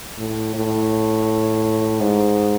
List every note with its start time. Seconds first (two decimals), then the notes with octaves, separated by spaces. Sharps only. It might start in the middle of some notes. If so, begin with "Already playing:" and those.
0.18 A2
0.55 A2
2.00 G#2